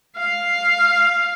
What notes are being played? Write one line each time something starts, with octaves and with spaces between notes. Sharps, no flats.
F5